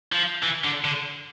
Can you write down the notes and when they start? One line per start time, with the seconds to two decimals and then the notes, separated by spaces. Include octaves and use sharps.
0.13 F3
0.43 E3
0.64 D3
0.85 D3